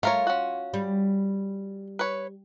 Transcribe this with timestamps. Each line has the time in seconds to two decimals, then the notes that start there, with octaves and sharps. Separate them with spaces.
0.03 A3 F4 A#4 C#5
0.27 C#4 F#4
0.74 G3
1.99 B4 C#5